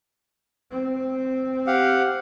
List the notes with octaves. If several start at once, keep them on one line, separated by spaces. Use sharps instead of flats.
C4
G4 F5 F#5